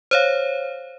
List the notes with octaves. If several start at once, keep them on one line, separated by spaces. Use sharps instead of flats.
C5 C#5 F5